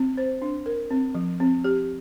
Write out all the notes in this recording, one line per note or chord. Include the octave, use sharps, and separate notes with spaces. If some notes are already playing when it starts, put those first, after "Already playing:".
Already playing: C4
C5
D4
A#4
C4
F3
C4
G4